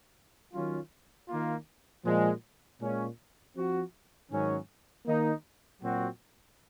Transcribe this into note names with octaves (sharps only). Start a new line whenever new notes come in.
D#3 F#3 C#4 F4
D#3 A#3 F4
A#2 F3 G#3
A#2 G#3 C#4 F4
F3 C4 F#4
G#2 D#3 F#3 C#4
D#3 A#3 D#4
A#2 F#3 C4 F#4